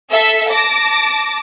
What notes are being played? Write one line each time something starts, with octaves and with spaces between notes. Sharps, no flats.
A4 E5
A5 D6 A#6